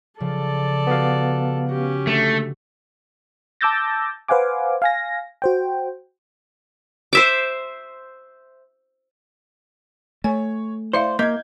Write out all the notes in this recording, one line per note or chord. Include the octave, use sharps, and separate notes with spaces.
C#3 F3 A4 D5
B3 F#4 G4 B4 F5
C#4 F#4 G4
D3 A3
A5 D6 E6 G6 A6 A#6
B4 C5 F5 F#5 G#5 D6
F5 G#5 A#6
F#4 C5 G5
C5 E5 D6
A3 C#5 G#5
E4 C5 D5 E5 F5
A#3 D#5 G6 G#6